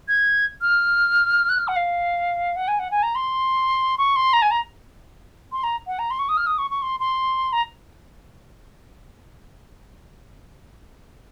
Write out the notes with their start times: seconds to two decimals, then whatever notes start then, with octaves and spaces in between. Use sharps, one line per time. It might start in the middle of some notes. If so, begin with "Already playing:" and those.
0.08 G#6
0.61 F6
1.49 F#6
1.58 F6
1.68 F#5
1.76 F5
2.56 F#5
2.68 G#5
2.79 F#5
2.91 G#5
3.03 A#5
3.15 C6
3.98 C#6
4.16 C6
4.33 A#5
4.42 G#5
4.51 A#5
5.52 C6
5.63 A#5
5.87 F#5
5.99 A#5
6.10 C6
6.19 C#6
6.29 D#6
6.37 F6
6.46 D#6
6.58 C#6
6.70 C#6
6.82 C6
7.00 C6
7.53 A#5